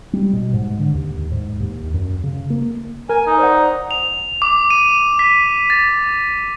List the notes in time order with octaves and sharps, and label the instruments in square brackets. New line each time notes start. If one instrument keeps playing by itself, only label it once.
[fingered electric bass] G3
B2
G#2
D3
D#2
G#2
D#2
F#2
C#3
A#3
[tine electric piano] A#4 [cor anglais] G#5
[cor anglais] D#4
[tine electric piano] C5 D5 F#5
[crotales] F7
D6
D#7
B6
A6